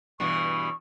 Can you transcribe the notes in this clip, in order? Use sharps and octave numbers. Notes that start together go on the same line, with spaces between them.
G2 B2 E3 C#6